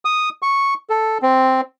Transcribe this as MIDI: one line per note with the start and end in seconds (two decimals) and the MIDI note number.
0.05 0.29 87
0.42 0.74 85
0.90 1.18 69
1.22 1.61 60